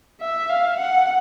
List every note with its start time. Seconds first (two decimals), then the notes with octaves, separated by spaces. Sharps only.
0.21 E5
0.50 F5
0.79 F#5